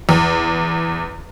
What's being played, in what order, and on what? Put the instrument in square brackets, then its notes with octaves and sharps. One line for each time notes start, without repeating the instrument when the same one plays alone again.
[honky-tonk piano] E2